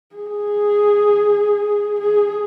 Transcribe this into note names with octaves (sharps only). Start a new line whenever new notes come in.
G#4
G#4